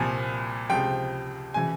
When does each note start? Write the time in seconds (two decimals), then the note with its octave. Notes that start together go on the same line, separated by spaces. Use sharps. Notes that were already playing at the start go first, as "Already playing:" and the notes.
Already playing: C2 A#2 F3 G#5
0.70 C#2 C3 F3 G5
1.54 C#3 E3 G#5